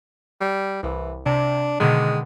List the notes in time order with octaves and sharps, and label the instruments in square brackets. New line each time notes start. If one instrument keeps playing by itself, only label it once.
[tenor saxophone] G3
[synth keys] C2 [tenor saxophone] E3
[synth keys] C3 [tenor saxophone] D4
[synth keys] B2 D3 D#3 [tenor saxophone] G#3